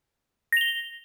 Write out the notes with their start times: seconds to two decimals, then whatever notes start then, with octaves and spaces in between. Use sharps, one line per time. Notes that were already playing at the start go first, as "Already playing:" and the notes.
0.52 A#6
0.57 F7
0.61 G7